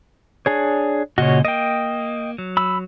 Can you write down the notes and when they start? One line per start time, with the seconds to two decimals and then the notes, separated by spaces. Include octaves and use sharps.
0.46 D4 G#4 C#5
1.18 A#2 C#3 F#4 C#5 D#5
1.45 A#3 D#5 G5
2.38 F#3
2.57 B5 E6